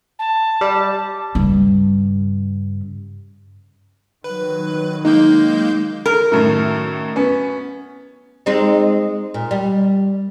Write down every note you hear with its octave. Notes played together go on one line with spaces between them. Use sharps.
A5
G3
G2 C#3
D#3 F#3 B4
G#3 A#3 D#4 G6
A#4
F#2 A2 D#3
B3 C#4
G#3 C4 D#4
A#2
G3